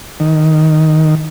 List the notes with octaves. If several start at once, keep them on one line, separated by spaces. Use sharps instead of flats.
D#3